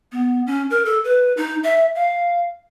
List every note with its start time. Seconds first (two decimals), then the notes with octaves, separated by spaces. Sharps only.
0.12 B3
0.47 C#4
0.70 A#4
0.85 A4
1.04 B4
1.37 D#4
1.63 E5
1.96 F5